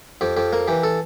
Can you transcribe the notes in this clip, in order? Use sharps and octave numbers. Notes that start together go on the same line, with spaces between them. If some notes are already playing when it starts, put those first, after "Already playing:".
F2 G4
F2 G4
A#3
E3 G4
A4